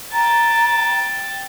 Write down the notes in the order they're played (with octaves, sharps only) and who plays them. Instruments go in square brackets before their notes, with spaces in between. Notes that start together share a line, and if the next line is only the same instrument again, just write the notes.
[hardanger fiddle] G5 A5 [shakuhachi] A#5